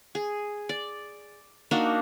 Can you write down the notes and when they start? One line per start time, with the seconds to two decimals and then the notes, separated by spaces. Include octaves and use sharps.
0.15 G#4
0.69 D5
1.71 A#3 D4 D#4 F#4